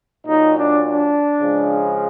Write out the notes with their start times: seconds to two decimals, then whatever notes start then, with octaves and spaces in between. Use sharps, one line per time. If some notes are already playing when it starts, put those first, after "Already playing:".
0.27 A#2 F#3 D#4
0.56 D4
0.84 D4
1.41 C#3 F3 G#3